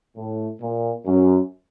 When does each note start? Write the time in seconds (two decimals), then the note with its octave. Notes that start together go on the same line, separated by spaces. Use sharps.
0.16 A2
0.61 A#2
1.06 F#2